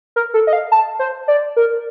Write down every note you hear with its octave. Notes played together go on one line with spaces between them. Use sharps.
A#4
A4
D#5
F5
A5
C5
D5
A#4